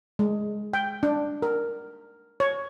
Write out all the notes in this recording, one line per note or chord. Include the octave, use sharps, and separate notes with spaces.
G#3
G5
D4
A#4
C#5